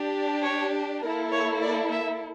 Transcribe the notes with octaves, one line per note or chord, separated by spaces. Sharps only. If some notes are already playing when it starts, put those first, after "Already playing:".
Already playing: D4 G4
C#5
A#3 E4 A4 A#4
C#5
D5
E5